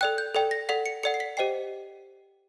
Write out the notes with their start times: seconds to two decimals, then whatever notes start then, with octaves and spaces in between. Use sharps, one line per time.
0.01 A4 D5 G5 F#6
0.18 G6
0.35 A4 D5 G5
0.51 A#6
0.69 A4 D5 F#5 B6
0.86 C#7
1.03 A4 D5 F#5 C#7
1.14 C7
1.20 B6
1.37 G4 C5 D#5 G5 C7